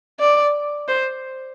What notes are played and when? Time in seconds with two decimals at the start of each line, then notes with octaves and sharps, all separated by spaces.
0.20 D5
0.88 C5